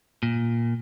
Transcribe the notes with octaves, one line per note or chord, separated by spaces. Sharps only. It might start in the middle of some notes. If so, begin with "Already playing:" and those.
A#2